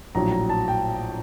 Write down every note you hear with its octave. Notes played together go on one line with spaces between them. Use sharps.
A#1 A2 F#3 A#5
A#5
A5
G5